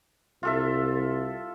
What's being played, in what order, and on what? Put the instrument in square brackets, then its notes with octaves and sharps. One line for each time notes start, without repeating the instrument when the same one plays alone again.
[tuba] C2 [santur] F4 A4 E5